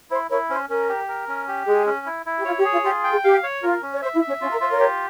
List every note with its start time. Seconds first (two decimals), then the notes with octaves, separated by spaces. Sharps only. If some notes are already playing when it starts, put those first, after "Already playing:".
0.11 E4 C5
0.30 E4 A#4 C#5
0.50 C#4 C5
0.69 C#4 A#4
0.89 G4
1.09 A#4
1.28 C#4
1.48 G4
1.67 G#3 G#4
1.86 C#4
2.06 E4
2.26 E4
2.38 G4
2.45 F4 C#5
2.58 G4
2.65 G#4
2.72 F4
2.84 F4 G4
3.04 G5
3.11 G#4
3.24 G4 F5
3.43 C#5
3.62 F4 A#4
3.82 C#4
3.93 C#5
4.02 C5 E5
4.15 E4
4.21 E5
4.28 C#4
4.41 C#4 F4
4.51 A#4
4.60 F4 C5
4.70 A#4 C#5
4.80 G4